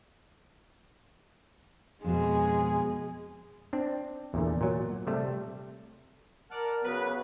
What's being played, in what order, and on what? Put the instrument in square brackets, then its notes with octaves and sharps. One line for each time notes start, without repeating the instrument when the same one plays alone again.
[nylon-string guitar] F2 B2 [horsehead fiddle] G#3 G#4
[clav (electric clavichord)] C4 D4
E2 A#2 D3
A#2 F#3
C3 G3 A3
[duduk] A#4 [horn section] D5 [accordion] F#5 A5 F6
[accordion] C#3 F#3 [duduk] B3 [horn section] B4